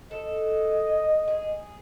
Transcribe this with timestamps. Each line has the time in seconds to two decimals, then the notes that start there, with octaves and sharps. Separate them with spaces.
0.11 A4 D#5
1.28 G#4